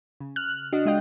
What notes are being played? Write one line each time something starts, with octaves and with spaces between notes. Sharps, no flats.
C#3
F6 F#6
D4 F#4 D#5
G#3 F4 D#5 G5